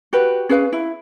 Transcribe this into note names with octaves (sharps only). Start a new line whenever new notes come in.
F#4 G4 B4
C#4 G#4 B4 F5
E4